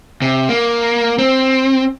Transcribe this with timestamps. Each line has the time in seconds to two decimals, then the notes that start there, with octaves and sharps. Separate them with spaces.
0.22 C3
0.49 A#3
1.18 C4